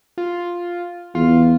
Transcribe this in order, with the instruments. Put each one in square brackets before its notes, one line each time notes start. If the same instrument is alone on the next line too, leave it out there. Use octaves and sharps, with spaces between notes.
[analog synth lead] F4
[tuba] E2 [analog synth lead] F4